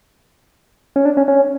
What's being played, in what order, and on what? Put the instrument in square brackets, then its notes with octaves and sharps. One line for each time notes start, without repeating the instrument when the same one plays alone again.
[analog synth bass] C#4
D4
C#4
C#4